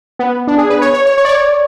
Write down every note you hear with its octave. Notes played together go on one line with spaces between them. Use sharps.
B3
D4
G#4
B4
C#5
C#5
C#5
C#5
D5
C#5